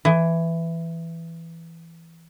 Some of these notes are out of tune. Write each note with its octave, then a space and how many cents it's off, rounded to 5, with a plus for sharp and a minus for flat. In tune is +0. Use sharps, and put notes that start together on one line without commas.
E3 +10